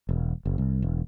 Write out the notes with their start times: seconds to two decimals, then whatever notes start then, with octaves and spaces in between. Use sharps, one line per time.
0.09 E1
0.45 F#1
0.58 C2
0.82 E1